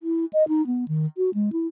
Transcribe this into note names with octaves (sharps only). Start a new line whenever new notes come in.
E4
D#5
D#4
B3
D#3
F#4
G#3
E4